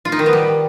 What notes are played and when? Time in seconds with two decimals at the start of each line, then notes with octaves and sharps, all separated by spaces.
0.05 F4
0.12 D#4
0.19 D#3
0.26 B3
0.33 G3